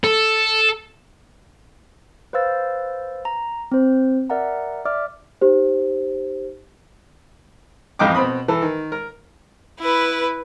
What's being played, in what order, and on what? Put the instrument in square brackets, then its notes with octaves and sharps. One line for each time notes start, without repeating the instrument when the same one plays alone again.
[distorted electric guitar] A4
[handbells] B4 C5 F5 E6 A6
A#5
C4 C5
A#4 D5 E5 F#5 A#5
D5 E5 D6 F6
[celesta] D#4 G4 C5
[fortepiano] A1 F2 D#5 F5 G5 D6
B2 C4 B5 D#6
E3 A4
D#3
A#4
[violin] E4 B4